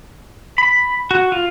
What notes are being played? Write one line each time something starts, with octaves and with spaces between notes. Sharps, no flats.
B5
F#4
F4